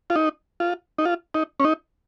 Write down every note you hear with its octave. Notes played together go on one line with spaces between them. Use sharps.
F4
D#4
F4
D#4
F4
D#4
C#4
D#4